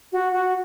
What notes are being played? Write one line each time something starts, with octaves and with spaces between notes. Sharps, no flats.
F#4
F#4